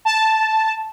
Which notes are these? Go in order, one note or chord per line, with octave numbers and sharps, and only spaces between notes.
A5